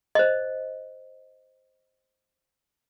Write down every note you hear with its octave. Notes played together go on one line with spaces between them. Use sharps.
C5 D#5